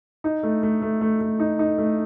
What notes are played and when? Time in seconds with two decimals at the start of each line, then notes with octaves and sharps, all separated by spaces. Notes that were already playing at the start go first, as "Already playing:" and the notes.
0.24 D#4
0.43 A3
0.63 A3
0.82 A3
1.01 A3
1.21 A3
1.40 D#4
1.59 D#4
1.78 A3